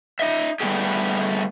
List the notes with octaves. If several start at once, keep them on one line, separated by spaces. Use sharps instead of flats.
D#4 D#5 E5
G3 A3 B3 D#4 G4 G#4